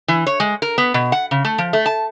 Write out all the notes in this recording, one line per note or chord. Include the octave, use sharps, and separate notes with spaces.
E3
C#5
G#3
A#4
B3
B2
F#5
C#3
A3
F3
A3
A5